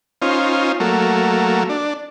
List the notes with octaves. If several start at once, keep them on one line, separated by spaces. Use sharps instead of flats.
C#4 D#4 F4 C5
F#3 A3 A#3
D4